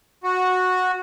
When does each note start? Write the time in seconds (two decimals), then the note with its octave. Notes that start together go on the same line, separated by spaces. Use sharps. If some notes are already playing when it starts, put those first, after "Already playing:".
0.23 F#4